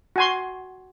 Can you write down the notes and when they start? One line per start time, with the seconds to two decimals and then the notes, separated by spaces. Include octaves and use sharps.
0.16 F#4 G#5 C6